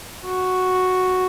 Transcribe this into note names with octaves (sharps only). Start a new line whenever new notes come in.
F#4